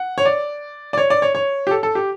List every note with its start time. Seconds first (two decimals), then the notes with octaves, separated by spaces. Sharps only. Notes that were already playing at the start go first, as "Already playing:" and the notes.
Already playing: F#5
0.18 C#5
0.26 D5
0.93 D5
0.98 C#5
1.10 D5
1.22 C#5
1.35 C#5
1.67 G4
1.71 A4
1.83 A4
1.95 G4